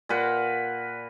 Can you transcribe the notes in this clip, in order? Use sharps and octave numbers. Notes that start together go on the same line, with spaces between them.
A#2 A#4 B4 F#5